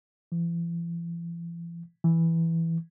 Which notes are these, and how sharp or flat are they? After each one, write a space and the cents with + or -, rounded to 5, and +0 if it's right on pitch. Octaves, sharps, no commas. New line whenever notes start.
E3 +45
E3 +0